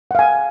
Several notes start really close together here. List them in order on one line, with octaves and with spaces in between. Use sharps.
F#5 F5 G#5